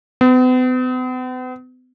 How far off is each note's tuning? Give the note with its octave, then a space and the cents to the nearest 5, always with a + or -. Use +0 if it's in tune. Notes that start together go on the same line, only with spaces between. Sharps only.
B3 +45